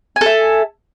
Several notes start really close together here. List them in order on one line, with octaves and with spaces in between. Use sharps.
G#5 A4 E5